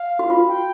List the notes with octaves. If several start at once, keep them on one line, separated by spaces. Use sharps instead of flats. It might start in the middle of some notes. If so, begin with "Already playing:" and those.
Already playing: F5
F#4
F4
G5